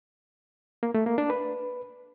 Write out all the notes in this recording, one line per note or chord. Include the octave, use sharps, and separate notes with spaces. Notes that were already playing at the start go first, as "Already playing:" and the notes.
A#3
A3
A#3
D4
B4